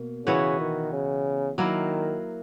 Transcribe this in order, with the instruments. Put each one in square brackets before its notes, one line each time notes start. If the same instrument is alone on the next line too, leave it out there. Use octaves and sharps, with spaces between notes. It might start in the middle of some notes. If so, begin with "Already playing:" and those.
Already playing: [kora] B2 A#3
[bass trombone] C#3 [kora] E3 B3 F#4 C#5
[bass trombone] D#3
C#3
[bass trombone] D#3 [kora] F#3 A#3 E4